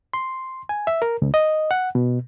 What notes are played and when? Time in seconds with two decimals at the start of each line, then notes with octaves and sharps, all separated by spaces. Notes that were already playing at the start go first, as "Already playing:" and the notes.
0.13 C6
0.69 G#5
0.87 E5
1.02 A#4
1.22 C#2
1.34 D#5
1.71 F#5
1.95 B2